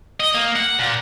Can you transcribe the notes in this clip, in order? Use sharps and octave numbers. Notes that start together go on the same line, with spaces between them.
D#5
A#3
F#5
A#2